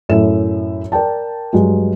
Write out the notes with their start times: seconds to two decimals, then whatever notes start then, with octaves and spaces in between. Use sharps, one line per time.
0.09 F#2 A2 A4 E5 E7
0.92 A#4 D5 G5 A5
1.53 G2 F#3 G#3